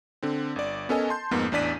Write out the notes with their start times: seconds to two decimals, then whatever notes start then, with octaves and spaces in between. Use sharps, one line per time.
0.23 D3 C4
0.56 G1 D5
0.89 B3 C#4 A4 A#4 D#5 G#5
1.09 A5 C6 G6
1.31 F2 G#2 A#3 B3
1.52 A1 E2 D4 D5 B6 D#7